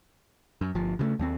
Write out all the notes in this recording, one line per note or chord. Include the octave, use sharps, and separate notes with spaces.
F#2
G1 F3
C#3 F3 A3
D#2 G#3 C4